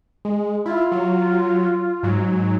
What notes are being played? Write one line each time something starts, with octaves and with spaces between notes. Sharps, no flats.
G#3
E4 F4
F#3
G#2 F#3